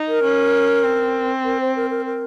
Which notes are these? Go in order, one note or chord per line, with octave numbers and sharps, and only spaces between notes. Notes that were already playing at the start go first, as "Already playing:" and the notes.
Already playing: D#4
A#4
C#4
C4
A#4
C5
A#4
A#4
A#4